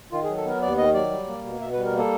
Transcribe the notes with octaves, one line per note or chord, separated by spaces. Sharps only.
D#3 F4
G#4
F#3
A4
B3 A#4
D#2 D5
D#3 D#5
F#3 D5
G3
A#3
B2
B2 E5
B4
G3
A#4
A#3 A4